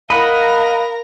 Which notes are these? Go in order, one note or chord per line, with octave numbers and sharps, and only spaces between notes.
A#4 D#5 F5 F#5 A#5 B5